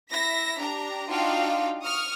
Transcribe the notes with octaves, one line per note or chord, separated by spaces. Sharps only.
E4 E5 A#6 B6
D4 G4 A#5
D4 D#4 F4 F#4 F5 G5
C#6 D#6 F6